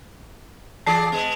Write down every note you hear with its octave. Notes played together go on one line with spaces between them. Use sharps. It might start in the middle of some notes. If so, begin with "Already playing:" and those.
E3 G#4 D5 A5 C7
G#3 B3